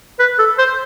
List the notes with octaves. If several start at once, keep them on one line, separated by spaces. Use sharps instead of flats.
B4
A4
C5